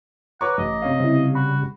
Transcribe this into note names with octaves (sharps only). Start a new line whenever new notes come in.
B4 C#5 F#5 A#5 C#6 D6
A1 D#5
C3 C#5 F5
C#3 G3 C4 E4
F#4 B5